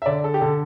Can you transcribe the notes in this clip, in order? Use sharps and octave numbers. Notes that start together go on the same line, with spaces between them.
E5
D3 D5
A4
G4
D3 A4